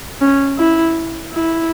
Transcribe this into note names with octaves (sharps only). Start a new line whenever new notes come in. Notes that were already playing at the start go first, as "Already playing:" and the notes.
C#4
E4
E4